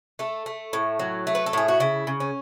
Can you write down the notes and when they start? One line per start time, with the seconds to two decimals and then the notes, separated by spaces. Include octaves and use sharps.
0.19 A3 A4
0.46 A3
0.73 A2
0.99 F#3
1.27 A3
1.35 B4
1.46 A4
1.53 A2 G#4
1.68 F#4
1.80 C#3 E4
2.07 C#3
2.20 C#4